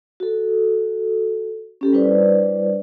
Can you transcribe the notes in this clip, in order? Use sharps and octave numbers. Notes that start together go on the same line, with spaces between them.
F#4 A4
C#4 G4 A4
G3 D4 E4 B4 C5 D5